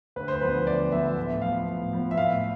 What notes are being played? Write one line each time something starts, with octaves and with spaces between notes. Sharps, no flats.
D2 B4
C5
D3 F3 B3 B4
D2 D5
D3 F3 B3 E5
A2
F3 B3 F5
A2
F3 B3
E5
A2 F5